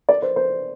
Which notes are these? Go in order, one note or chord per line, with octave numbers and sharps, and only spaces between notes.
D5
C5
C5